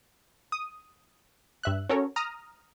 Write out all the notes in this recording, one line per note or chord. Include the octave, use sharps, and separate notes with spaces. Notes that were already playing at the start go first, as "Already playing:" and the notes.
D#6
G2 E5 F#6
C#4 F#4 A4 A#4 C#5
A#5 D#6 F6